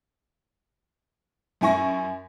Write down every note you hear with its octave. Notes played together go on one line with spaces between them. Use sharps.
F#2 E4 G#5 C#6 A#6